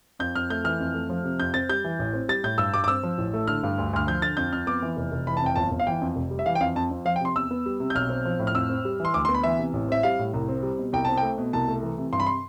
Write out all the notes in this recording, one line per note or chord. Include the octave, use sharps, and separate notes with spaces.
F2 G6
F2 F6
A3 G6
E3 F6
F2
A3
F3
C3
F2 G6
C4 A6
G3 G6
E3
A1
C4
G3 A6
A2 G6
G2 E6
G2 D6
D6
C4 E6
F3
A1
A3
D3 F6
G2
D2
D2 F6
F3 G6
D3 A6
F2 G6
F2 F6
B3 D6
E3
F1
F1
E3 B5
A5
F2 G5
G1 A5
G1
F5
E3 G5
F2
F1
G3
E5
E3 F5
G5
F2 F5
F2 A5
F2
F3 F5
G5
C3 C6
E2 E6
B3
G3
C3
G6
B1 F6
C4
F3
A2
F6
F2 E6
C4
G3
E3 C6
D2 D6
C6
B3
B5
E3 E5
C3
A1
C4 E5
G3 F5
A2
C2
C4
G3
B2
C2 G5
C4 A5
G5
A3
B2
C2 A5
A3
E3
C3
G2 C6
B5
C6